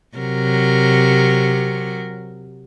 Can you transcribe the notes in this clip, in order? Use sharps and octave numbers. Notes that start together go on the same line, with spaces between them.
C3 F#3 A#4